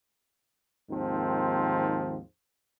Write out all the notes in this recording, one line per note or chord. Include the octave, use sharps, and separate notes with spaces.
D#2 G#2 D#3 F3 C4